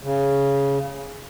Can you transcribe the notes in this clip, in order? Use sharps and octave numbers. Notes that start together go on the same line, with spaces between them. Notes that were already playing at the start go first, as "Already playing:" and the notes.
C#3